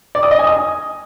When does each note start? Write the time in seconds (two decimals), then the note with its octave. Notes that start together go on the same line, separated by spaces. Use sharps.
0.15 D5
0.23 D#6
0.31 D#5
0.39 G#5
0.47 D#6